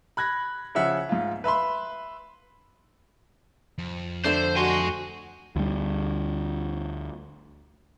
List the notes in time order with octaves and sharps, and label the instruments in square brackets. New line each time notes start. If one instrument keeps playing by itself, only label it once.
[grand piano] B5 F#6 G#6 A#6
C#3 F3 E5 F#5
G#2 F4
B4 E5 B5 C6
[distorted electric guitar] F2
[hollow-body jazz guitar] D3 A3 D4 [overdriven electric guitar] C5
[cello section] F#4 [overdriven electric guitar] G#5 C6
[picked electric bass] D2 G3